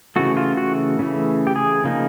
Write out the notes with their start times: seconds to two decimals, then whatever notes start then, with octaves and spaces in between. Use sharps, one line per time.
0.16 C#3 E3 A3 F#4
0.37 F4
0.57 F#4
0.99 C#3 E3 A3
1.47 G4
1.56 G#4
1.84 C#3 F3 A#3 D#4